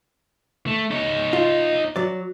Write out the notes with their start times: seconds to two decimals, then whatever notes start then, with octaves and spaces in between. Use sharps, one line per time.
0.67 A3
0.91 D#4 C#5
1.33 F4
1.96 F#3 D5